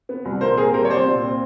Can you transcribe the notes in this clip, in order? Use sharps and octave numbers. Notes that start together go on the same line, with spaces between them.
B3
C2
A#2 A#4 C5
C4 G#4 A#4
G3 A#4 C5
C#5
C2 C5 D5
A#2
C4